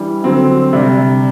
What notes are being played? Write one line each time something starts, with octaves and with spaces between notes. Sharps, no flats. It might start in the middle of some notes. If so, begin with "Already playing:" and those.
Already playing: E3 G3 D4
D3 F#3 C4
C3 G3 D4